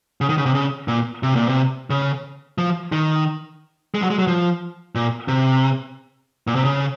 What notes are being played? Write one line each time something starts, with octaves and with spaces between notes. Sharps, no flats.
C#3
D#3
C#3
C3
C#3
A#2
C3
A#2
C3
C#3
F3
D#3
G#3
F#3
G#3
F#3
F3
A#2
C3
A#2
C3
C#3